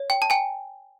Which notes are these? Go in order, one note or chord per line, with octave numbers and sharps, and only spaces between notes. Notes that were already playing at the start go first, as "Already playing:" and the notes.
Already playing: C#5
G5
A5
G5 G#5